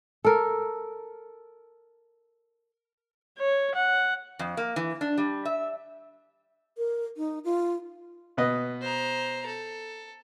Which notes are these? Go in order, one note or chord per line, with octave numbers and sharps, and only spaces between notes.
A4 A#4
C#5
F#5
F2
A#3
E3
D4
G3
E5
A#4
D#4
F4
B2 B4 D#5
C5 A#5
A4